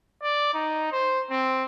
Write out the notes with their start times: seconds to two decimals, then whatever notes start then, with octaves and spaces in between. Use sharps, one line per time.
0.22 D5
0.54 D#4
0.92 C5
1.30 C4